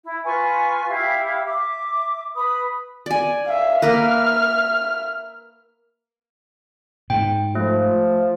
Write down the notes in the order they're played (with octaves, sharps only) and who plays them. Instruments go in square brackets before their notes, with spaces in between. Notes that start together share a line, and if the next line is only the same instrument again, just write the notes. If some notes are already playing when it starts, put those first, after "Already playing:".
[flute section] E4
F4 B4 G#5 C#6
E4 G4 E5 F5
E5 D6
B4 B5 D#6
[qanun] D5 G#5
[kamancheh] E5 F5
[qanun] A#3 A#4 B4 [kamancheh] E5 F6
[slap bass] G#2 [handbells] G5
[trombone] F3 [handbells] A3